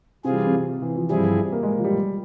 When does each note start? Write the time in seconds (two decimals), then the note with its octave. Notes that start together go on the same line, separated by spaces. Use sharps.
0.24 C3 E3 G3 C4 F4 G#4
0.46 C3
0.82 E3
0.96 F3
1.09 G2 F3 G3 C4 E4 G#4
1.53 A#3
1.63 G#3
1.79 F3
1.84 G3